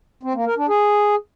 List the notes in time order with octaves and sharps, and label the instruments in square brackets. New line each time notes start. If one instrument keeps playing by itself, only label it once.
[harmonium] C4
A#3
A#4
D4
G#4